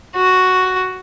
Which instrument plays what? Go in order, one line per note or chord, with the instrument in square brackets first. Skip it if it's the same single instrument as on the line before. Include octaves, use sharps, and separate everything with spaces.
[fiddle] F#4